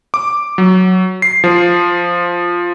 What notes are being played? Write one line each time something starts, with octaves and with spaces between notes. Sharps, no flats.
D6
F#3
C7
F3